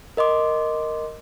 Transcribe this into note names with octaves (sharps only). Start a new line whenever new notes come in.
A#4 D#5 C6 D6